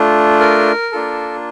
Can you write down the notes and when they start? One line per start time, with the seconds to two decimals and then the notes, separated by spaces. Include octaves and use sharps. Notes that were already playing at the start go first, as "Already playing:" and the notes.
Already playing: A3 D4 F4
0.40 A#4
0.92 A#3 D4 F4 A4